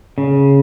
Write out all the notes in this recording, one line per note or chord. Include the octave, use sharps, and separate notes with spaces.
C#3